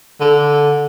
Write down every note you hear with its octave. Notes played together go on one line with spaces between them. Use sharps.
D3